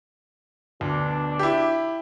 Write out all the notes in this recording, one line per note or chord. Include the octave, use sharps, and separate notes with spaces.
D2 B2 D4
E4 G4